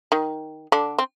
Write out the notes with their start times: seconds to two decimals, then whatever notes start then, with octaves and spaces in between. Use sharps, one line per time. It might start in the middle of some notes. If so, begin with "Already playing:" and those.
0.12 D#3
0.72 D3 D4
0.99 C4